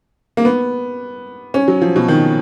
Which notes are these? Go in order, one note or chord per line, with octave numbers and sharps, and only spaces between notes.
A#3
B3
C#4
F#3
F3
B2
D#3